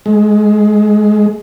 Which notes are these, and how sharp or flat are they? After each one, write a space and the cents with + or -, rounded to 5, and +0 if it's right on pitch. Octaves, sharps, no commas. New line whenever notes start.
G#3 +15